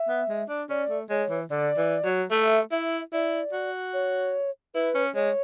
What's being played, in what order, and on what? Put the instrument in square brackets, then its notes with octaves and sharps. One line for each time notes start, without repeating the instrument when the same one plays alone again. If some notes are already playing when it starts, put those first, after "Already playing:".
Already playing: [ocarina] E5
[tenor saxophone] B3
G#3
D4
[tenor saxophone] C#4 [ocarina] D5
[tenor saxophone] A3
[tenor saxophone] G#3 [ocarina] C#5
[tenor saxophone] E3
[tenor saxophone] D3 [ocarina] D5
[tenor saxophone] E3
F#3
[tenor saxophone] A3 [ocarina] E5
[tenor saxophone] E4 [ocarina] E5
[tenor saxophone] E4 [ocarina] D5
[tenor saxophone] F#4
[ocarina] C#5
[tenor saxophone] E4 [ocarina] B4
[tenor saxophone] C#4
[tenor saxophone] G#3 [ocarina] C#5